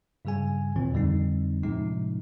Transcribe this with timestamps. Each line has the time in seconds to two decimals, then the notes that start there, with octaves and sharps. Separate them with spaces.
0.25 G2 C#3 G3 G#4 G#5
0.76 D#2 A#2 D#3 E3 C4
0.93 F2 D3 G3 C4 D#4
1.63 F#2 A2 C3 F3 G#3 D#4